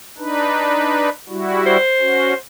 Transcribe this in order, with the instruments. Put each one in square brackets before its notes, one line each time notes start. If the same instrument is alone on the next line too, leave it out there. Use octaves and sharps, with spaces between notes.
[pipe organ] D4 D#4 B4
G3 E4 F#4
[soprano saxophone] C5
[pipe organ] C#4 F#4